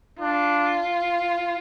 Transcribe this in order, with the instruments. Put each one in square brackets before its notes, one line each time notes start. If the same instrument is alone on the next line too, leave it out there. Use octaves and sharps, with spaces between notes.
[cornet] D4 [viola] F4